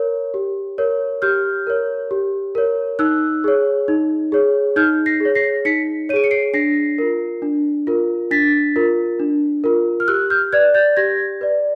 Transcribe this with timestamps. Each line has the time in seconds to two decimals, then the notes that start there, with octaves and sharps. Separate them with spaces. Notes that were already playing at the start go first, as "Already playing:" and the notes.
Already playing: A#4 C#5
0.34 G4
0.78 A#4 C#5
1.22 G4 F6 G6
1.67 A#4 C#5
2.11 G4
2.55 A#4 C#5
2.99 D#4 E6 F#6
3.44 G#4 C#5
3.88 D#4
4.32 G#4 C#5
4.76 D#4 F6 G6
5.06 A#6 C7
5.20 G#4 C#5
5.35 A#6 C7
5.65 D#4 B6 C#7
6.09 C#5 D#7
6.14 G#4 D7
6.24 C#7
6.31 C7 D7
6.54 D4 A#6 C7
6.98 F4 A#4
7.42 D4
7.87 F4 A#4
8.31 D4 A6 B6
8.76 F4 A#4
9.20 D4
9.64 F4 A#4
10.00 F6
10.08 G4 E6 F#6
10.30 F6 G6
10.53 B4 D5 F#6 G#6
10.74 G6 A6
10.96 G4 G#6 A#6
11.41 B4 D5